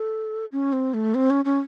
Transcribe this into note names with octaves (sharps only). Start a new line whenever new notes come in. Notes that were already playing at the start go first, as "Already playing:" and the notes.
Already playing: A4
C#4
C4
A3
C4
C#4
C#4